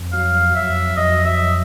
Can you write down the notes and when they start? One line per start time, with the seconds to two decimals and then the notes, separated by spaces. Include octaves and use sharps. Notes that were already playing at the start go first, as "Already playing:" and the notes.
Already playing: F2
0.13 F#3 F5
0.41 F#3
0.55 E5
0.70 F2
0.97 F2 D#5
1.25 F#3 E5